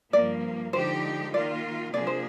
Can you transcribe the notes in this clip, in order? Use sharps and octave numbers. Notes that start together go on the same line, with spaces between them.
G2 F3 A#3 D5
D3 F3 G#3 D#4 G4 C5
D#3 A#3 F4 D5
C3 F3 A#3 D4 G#4 D5
C5